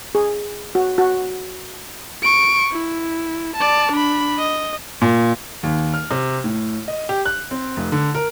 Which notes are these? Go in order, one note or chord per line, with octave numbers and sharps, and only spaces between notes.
G#4
F#4
F#4
C#6 D7
E4
D5 A5
D4 B5
D#5
A#2
D#2
F6
C3
A2
D#5
G4
F#6
C4
F1
D3
A#4